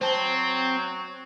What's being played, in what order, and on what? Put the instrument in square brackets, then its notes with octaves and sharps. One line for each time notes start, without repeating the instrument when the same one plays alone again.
[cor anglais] F#3 [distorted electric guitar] C4 [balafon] C5 A5